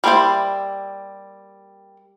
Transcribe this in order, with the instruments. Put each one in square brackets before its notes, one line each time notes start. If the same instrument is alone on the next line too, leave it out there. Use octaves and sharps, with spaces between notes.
[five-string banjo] G3 A#3 D4 E4 C5